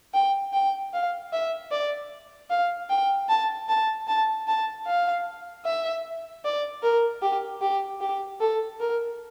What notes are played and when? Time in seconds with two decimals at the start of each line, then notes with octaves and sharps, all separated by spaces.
0.14 G5
0.53 G5
0.93 F5
1.33 E5
1.71 D5
2.50 F5
2.90 G5
3.29 A5
3.69 A5
4.08 A5
4.48 A5
4.87 F5
5.65 E5
6.45 D5
6.83 A#4
7.22 G4
7.62 G4
8.01 G4
8.40 A4
8.80 A#4